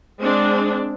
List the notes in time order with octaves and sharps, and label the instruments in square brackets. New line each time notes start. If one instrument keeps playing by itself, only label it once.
[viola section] G#3 C4 D4